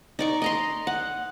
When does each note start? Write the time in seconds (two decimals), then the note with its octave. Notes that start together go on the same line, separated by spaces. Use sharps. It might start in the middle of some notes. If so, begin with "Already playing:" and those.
0.19 D#4 D5 C#6
0.42 D#5 A#5 C6
0.87 F#5